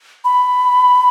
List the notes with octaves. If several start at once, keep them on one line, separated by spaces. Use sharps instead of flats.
B5